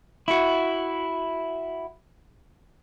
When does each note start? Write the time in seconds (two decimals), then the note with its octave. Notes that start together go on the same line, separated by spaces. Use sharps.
0.28 E4 F#4